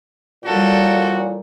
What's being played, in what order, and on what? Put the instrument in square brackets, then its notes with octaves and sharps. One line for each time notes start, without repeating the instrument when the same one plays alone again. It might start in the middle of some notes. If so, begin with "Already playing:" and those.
[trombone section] A1 A#2 [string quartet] G3 A4 G5 [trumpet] F#4